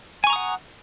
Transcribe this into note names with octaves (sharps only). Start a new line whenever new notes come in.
F#5 G#5 A#5 C#6 D#6